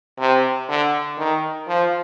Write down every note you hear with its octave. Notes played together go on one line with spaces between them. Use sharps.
C3
D3
D#3
F3